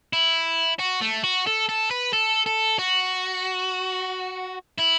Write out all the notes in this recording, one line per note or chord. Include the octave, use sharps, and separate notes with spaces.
E4
F#4
A3
F#4
A4
A4
B4
A4
A4
F#4
E4